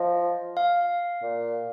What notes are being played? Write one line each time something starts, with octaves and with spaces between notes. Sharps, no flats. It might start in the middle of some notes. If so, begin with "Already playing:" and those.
Already playing: F3 D#5
F5
A#2